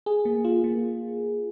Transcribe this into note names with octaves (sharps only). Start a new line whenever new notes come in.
G#4
A#3
F4
A#3